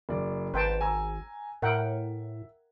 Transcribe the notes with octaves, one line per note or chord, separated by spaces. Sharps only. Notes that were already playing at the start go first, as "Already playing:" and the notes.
F#1 D5
G#1 B4 C5 G5 A5
G#5 A#5 E6
A2 A#4 E5 F#5 G5